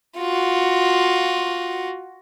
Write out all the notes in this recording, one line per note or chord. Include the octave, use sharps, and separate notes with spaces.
F4 F#4